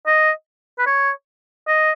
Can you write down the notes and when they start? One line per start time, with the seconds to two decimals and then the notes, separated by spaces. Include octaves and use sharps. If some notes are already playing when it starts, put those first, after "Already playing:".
0.07 D#5
0.78 B4
0.87 C#5
1.67 D#5